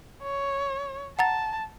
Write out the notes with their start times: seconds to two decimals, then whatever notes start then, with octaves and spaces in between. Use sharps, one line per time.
0.22 C#5
1.19 F#5 A5 A#5 A6